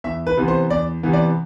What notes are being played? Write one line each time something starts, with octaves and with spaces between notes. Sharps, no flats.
E2 E5
B4
C3 E3 B3
C5
E2 D5
C3 E3 B3
D5